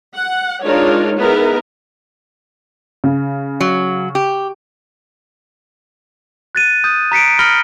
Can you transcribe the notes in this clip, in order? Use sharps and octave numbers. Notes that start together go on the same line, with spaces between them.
F#5
G#3 D4 D#4 F4 A#4 C#5
B3 D#4 E4 G#4 A#4
C#3
F#3
G4
F#6 A6 D#7
D#6 G6
A#5 B6 C#7 D7
B5 F6 A#6 C#7 G7